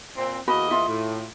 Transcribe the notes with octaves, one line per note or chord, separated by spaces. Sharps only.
A#2 C4
E2 A#3 F#4 D#5 B5
F4 E5
A2